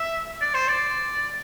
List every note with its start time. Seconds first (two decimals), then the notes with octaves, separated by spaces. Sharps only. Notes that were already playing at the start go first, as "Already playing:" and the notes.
Already playing: E5
0.41 D5
0.54 C5
0.68 D5